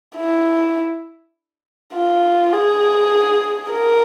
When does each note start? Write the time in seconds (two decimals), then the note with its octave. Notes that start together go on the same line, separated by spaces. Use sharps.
0.17 E4
1.94 F4
2.53 G#4
3.71 A#4